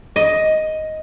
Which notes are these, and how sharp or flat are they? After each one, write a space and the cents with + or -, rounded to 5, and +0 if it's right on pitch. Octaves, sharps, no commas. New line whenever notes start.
D#5 +5